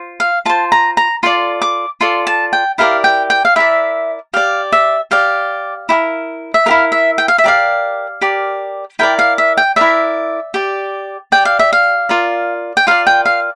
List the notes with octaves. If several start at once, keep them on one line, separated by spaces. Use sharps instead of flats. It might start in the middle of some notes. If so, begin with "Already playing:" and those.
Already playing: F4 C5
F5
F4 C5 A5
A#5
A#5
F4 A4 D5 C6
D6
F4 A4 D5 C6
A5
G5
E4 G4 A#4 D5 F5
G5
G5
F5
E4 G4 A#4 D5 E5
G4 D5 F5
E5
G4 D5 F5
E4 G4 A#4
E5
E4 G4 A#4 F5
E5
G5
F5
E5
G4 A#4 D5 F5
G4 A#4 D5
E4 A#4 D5 G5
F5
E5
G5
E4 A#4 D5 E5
G4 D5
G4 D5 G5
F5
E5
F5
F4 A#4 D5
G5
F4 A#4 D5 F5
G5
F5